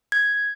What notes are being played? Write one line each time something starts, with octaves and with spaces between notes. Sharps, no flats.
G#6